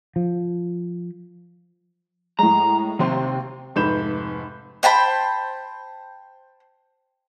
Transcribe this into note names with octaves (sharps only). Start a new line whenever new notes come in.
F3
A2 G#3 A#5
D#2 C3 C4 C6
F1 G#2 B4 B5 G6 E7
C5 G5 A5 B5